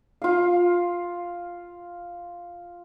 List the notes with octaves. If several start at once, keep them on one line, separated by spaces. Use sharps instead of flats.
F4 F5